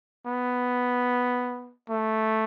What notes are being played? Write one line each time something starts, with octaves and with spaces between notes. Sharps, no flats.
B3
A3